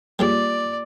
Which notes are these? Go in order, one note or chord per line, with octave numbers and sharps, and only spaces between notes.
G3 G#3 A#3 F4 G4 C#5 D5